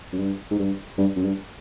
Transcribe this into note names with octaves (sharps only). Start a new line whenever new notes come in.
F#2
G2
G#2
G2
G2
F#2
G2